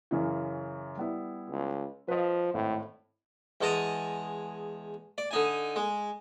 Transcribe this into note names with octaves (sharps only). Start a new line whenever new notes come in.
F#2 C#3 E3
G3 B3 E4
C#2
F3 B4 D#5
G#1 A2
E2 G#3 A5 A#5 D#6
D5
D3 D#4 G#5
G#3